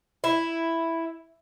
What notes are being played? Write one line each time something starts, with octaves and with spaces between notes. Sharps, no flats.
E4